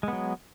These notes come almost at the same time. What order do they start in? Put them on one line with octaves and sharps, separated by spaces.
G#3 B3 F#3